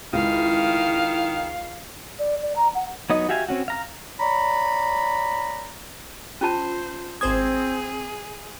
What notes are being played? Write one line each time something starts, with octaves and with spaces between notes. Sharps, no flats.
C#2 D#3 E4 F5
D5
D5
A#5
F#5
F#3 B3 D#4 D#5
F#4 G4 E5 F5 G#5
C4 C#4 F#4
F5 A#5 F6
C#5 D5 A#5 B5
C#4 F4 C5 A5
G#1 C4 G#4 C5 D#6 G#6